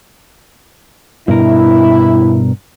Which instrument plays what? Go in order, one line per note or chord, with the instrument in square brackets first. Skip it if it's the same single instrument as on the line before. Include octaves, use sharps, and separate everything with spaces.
[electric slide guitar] G2 B2 A#4 [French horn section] E4